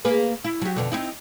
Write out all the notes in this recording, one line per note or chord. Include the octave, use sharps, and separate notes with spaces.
A#3 G#4 B4
E4
F#3 G4
F2 B2 D3
C4 D#4 E4